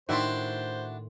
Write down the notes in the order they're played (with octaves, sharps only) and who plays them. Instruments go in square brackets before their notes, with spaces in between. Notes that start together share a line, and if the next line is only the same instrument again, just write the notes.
[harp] A2 C6 [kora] D#3 [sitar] D4 E4 F#4 [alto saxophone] C5